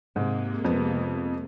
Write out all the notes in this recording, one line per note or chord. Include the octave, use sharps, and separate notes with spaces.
G#2 C3 G#3 A#3
F2 B3